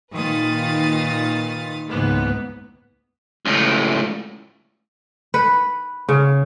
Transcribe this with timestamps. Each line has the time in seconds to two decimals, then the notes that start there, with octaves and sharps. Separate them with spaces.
0.13 A#2 D#3 B4 F5 D#6 A6
1.89 C#2 G#2 E3 A#3 B3
3.45 C#2 A2
5.34 B4
6.09 C#3